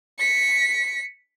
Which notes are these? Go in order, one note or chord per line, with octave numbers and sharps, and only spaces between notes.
B6 C#7